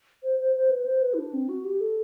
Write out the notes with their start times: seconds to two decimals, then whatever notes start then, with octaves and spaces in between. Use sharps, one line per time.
0.23 C5
0.39 C5
0.55 C5
0.70 B4
0.86 C5
1.02 B4
1.14 E4
1.18 D4
1.33 C4
1.49 F#4
1.65 G4
1.81 A4